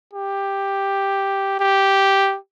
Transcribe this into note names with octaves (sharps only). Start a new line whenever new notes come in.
G4
G4